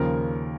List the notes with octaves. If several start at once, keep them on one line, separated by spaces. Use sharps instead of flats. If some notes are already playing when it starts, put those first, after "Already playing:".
Already playing: D#2 C#3 F3 A#4